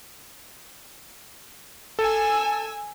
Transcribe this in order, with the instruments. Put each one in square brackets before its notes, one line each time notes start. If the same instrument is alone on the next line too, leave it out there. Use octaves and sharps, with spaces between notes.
[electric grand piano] A4 [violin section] G#5 E6